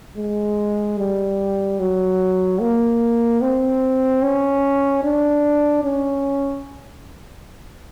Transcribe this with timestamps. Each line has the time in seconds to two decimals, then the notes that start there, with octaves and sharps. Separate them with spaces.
0.18 G#3
0.99 G3
1.80 F#3
2.60 A#3
3.41 C4
4.22 C#4
5.04 D4
5.84 C#4